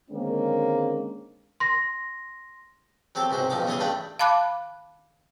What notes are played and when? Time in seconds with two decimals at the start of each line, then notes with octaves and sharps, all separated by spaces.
0.10 D3 D#3 G#3 A#3 C4 C#4
1.60 C6 A#6
3.15 F#3 C4 G4 A4
3.30 C#2 G#2 C3 F#4 C5
3.50 B1 G2 F3 D#4 D6
3.67 C#3 E3 C#4 F4 G#4 G#5
3.80 G2 G3 A3 D4 G5 B5
4.19 F5 A5 B5 D6 F#6